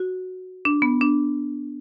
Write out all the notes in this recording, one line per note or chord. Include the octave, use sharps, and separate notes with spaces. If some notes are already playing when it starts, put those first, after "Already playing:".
Already playing: F#4
D4
B3
D4